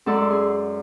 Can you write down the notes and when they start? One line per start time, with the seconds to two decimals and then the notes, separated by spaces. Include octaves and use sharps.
0.06 F#2 G#3 A4 D5 C6
0.30 G#4